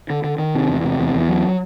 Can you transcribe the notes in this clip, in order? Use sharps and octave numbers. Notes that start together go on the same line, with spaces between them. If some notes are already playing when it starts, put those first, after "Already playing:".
D3
D3
D#3
C3
E2
C3
E2
E2
F#3